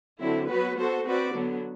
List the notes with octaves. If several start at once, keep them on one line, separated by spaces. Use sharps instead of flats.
D3 F#3 C4 E4
F#3 B3 F#4 B4
B3 F#4 A4 C5
C4 F#4 B4 D5
D3 F#3 B3